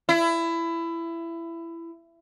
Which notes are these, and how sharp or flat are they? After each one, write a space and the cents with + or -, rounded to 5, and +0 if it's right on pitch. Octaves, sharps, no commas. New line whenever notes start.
E4 +20